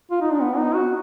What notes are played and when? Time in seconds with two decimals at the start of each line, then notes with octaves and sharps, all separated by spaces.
0.11 F4
0.22 D#4
0.31 D4
0.41 B3
0.57 D#4
0.75 F#4